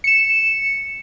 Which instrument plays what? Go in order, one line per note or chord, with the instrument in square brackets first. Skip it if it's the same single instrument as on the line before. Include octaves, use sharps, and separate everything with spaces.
[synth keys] C#7 E7